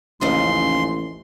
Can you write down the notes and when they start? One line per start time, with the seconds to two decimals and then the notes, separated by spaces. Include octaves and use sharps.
0.21 A1 D#2 C#3 F3 C6